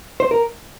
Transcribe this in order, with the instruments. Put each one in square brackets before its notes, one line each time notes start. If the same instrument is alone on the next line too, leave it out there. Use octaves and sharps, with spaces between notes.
[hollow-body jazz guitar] C5
A#4